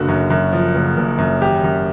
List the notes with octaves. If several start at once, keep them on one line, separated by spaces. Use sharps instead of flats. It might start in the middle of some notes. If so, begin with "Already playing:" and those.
Already playing: F#1 D3 F#4
F#2
F#2
F3
F#1
F#1
F#2
G#1 G4
F#2